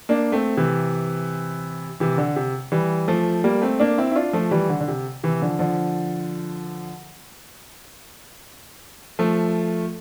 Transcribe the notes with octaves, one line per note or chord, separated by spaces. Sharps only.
A#3 D4
A3 C4
C3 E3
C3 E3
D3
C3
E3 G3
F3 A3
G3 A#3
A3 C4
A#3 D4
C4 E4
E4
D4 F4
F3 A3
E3 G3
D3
D3
C3
C3 E3
D3 F3
D3 F3
F3 A3